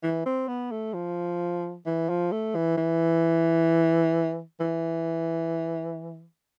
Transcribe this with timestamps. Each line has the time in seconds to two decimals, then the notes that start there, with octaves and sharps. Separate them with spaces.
0.03 E3
0.26 C4
0.48 B3
0.71 A3
0.94 F3
1.86 E3
2.09 F3
2.32 A3
2.55 E3
2.77 E3
4.60 E3